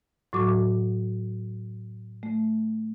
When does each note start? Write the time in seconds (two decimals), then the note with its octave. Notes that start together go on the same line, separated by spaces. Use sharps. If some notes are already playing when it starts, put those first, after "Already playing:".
0.33 A2 F#3 F#4 D6
2.23 A3